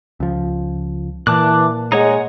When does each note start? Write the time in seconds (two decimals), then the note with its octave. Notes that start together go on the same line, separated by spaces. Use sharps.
0.20 C#2 F3
1.27 A#2 E3 A5 D6 F#6
1.92 G#3 D#4 C#5 F#5